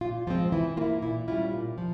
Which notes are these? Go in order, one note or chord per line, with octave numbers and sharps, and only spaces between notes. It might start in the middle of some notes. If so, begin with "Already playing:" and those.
A#2 F4
F3 G#3 C4 F4
E3 E4
A#3 E4 F4
A#2 E4
G3 C#4 E4 F4
A#2
F3